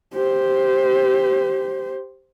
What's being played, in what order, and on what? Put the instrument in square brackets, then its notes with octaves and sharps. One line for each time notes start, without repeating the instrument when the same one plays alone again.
[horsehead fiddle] G4 C5